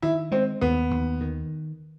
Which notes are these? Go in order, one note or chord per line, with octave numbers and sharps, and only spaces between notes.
D#3 E4
G#3 C4
D#2 B3
D#2
D#3